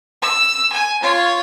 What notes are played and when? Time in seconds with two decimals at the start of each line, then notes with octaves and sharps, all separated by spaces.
0.22 E6
0.72 G#5
1.02 F4 C#5